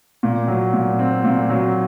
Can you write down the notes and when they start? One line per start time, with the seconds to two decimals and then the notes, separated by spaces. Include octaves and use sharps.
0.23 A#2
0.48 F#3
0.73 A#2
0.99 C4
1.24 A#2
1.49 F#3